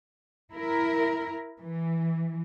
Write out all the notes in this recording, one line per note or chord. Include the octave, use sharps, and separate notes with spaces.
E4 A#4
E3